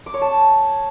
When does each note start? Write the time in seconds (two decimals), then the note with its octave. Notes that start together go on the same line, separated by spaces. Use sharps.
0.06 D6
0.14 C#5
0.22 A5